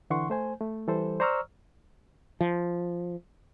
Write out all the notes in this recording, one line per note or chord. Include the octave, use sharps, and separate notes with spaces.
D3 E3 F#5 C6 C#6
A3 C5 G#5
A3
E3 G3 A4 C5
C5 D5 A#5 C#6 E6 F6
F3